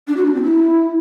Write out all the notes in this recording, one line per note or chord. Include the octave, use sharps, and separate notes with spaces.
D4
F#4
D4
C4
E4